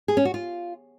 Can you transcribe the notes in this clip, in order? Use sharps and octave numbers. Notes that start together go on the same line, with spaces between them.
G#4
C#4
F#4
F4